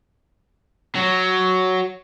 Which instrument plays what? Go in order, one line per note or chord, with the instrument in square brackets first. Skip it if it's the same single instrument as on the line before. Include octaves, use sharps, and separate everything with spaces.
[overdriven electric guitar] F#3